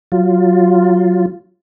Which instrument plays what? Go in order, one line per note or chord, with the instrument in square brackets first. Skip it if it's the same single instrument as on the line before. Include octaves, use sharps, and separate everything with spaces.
[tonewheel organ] F#3 F4